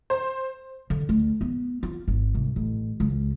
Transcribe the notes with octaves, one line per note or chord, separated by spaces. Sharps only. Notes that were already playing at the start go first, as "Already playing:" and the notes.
C5
D3
D2
B3
F4
G#1
C2
A1
C#2